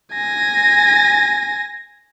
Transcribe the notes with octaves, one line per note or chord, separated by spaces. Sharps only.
G#5 A#6